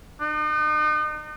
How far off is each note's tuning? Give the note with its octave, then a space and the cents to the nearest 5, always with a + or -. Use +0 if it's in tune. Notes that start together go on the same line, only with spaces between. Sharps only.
D#4 -40